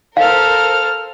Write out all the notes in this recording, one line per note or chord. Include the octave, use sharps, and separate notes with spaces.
A4 A#4 C5 F5 F6